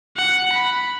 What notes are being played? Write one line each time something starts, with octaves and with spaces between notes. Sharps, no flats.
F#5
B5